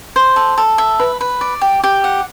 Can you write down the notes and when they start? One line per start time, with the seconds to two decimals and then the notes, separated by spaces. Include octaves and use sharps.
0.16 C5
0.36 A4
0.58 A4
0.78 E5
0.99 B4
1.21 B4
1.41 D5
1.61 G4
1.84 G4
2.04 F#5